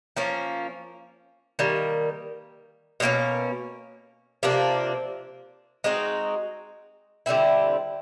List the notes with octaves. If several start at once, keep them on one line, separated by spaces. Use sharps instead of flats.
F3 A#3 C#4
D#3 G3 A#3
B2 G3 A#3 C#4
C3 F3 A#3 D4
G#3 C4 D#4 F#4
D3 G3 C4 E4